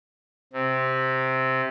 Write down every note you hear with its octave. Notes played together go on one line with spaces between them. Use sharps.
C3